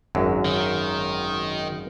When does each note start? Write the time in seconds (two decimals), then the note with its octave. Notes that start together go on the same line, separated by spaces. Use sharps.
0.15 G#1 F#2 F#3
0.45 D#3